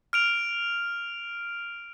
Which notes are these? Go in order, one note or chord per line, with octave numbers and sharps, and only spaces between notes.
F6 D7 F7